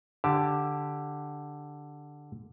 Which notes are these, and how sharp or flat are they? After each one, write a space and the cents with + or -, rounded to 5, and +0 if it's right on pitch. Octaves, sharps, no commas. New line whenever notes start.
D3 +0 G4 +0 A5 +0